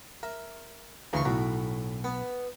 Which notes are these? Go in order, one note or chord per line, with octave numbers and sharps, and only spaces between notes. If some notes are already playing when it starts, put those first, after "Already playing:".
A#4 E5
D2 C#3 E3 A#5 C6 C#6
B1 A2 F#4 A#5
B3